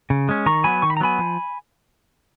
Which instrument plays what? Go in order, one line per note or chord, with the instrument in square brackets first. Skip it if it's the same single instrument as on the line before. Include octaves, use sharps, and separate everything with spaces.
[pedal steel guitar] C#3
G#3 C#4
D#3 A#5 C#6
F#3 B3 G#5 B5
D#3 C#6
B5
A#5
F#3 B3 G#5 B5
F3